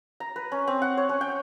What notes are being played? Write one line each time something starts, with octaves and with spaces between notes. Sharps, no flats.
A#5
B4
C#4
C4
F#5
C#5
C#4
G5